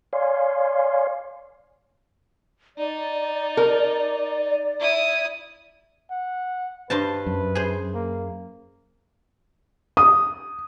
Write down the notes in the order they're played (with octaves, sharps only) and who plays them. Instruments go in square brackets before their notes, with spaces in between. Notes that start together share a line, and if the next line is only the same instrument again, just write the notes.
[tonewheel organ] C#5 D5 F5 G#5 C6
[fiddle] D#4 [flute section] D5
[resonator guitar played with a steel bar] A#4
[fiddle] E4 D#6
[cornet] F#5
[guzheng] G2 C5 A5 [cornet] B4
[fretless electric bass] F#2
[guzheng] G#4 C5
[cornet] A#3
[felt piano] D#6